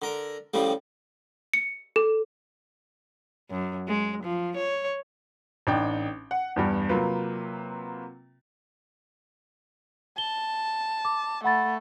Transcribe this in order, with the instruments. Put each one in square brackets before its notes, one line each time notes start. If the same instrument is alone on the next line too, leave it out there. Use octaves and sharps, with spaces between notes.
[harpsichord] D3 A#4
A2 C#3 F3 G3
[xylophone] C#7
A4
[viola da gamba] F#2
G#3
F3
C#5
[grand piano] A1 D4 D#4 G5
F#5
E2 G2 G3
C3 F#3 A#3 F4 B4
[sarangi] A5 [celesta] G7
[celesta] D6
[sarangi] A3 [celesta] F#5 B5 A6